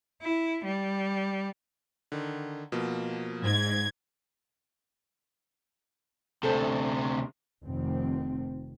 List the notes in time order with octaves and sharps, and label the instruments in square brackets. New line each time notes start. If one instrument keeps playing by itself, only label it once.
[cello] E4
G3
[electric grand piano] D3 D#3
B2 F3 A#3
[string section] G#2 G#6
[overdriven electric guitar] D2 C3 [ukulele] A4 C5
[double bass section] F1 D#3 C4